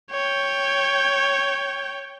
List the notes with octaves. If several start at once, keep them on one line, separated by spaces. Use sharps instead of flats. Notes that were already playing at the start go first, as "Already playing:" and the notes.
C#5 G5